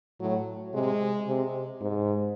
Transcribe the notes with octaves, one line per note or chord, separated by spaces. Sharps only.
A2 F#3
C3 G#3
C3
G#2